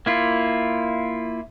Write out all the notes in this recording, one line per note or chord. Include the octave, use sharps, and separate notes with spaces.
A#3 E4 F4